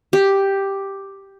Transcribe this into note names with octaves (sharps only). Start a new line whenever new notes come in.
G4